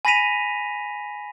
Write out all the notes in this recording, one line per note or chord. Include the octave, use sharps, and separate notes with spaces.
G#5 B5 A#6 B6 D#7 F7